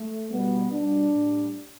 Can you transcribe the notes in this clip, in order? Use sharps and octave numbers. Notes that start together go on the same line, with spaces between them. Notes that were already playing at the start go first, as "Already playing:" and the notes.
Already playing: A3
B2 G3 B3
B2 G3 D4
A2 G3